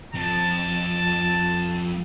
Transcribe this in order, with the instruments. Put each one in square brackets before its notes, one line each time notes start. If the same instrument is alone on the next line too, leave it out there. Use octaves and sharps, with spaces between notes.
[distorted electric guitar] F2 [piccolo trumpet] A5